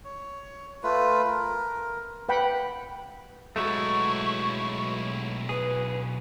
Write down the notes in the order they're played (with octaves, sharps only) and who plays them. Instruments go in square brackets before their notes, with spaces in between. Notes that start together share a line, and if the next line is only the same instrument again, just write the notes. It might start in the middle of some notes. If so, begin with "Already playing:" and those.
[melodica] C#5
A3 F4 B4
A#4
[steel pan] B4 F#5 G5 B5
[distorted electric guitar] B1 E4 [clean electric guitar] F#3 G#3 A3 [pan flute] C#6
[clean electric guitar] G#4 [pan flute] B4